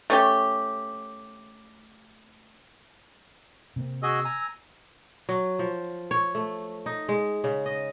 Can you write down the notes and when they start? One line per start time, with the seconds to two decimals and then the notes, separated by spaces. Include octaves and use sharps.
0.10 A3 C#4 G4
3.76 C3 A#3 C4
4.03 F#4 G#4 D#5 E6
4.25 G#5 A#5
5.29 F#3
5.59 F3
6.11 C#5
6.35 A3
6.86 D#4
7.09 G#3
7.44 C#3
7.66 D#5